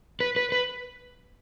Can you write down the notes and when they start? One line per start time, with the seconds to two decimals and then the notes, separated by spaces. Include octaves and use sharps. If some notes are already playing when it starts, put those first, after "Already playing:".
0.20 B4
0.36 B4
0.52 B4